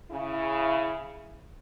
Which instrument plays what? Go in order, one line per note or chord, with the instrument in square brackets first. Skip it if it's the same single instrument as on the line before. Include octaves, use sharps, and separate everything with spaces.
[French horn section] C#3 E4